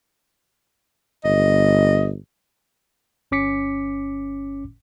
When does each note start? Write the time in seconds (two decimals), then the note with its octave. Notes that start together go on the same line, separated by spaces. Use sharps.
1.24 G1 D#5
3.31 G1 C#4 D6 B6 C#7